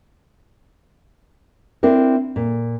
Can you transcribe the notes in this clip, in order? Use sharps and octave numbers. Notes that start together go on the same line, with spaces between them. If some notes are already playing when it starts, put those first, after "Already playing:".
C4 D4 E4 A#4
A#2